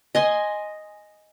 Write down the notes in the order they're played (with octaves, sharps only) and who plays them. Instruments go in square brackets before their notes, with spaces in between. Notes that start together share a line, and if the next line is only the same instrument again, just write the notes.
[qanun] D#5 G#5 C6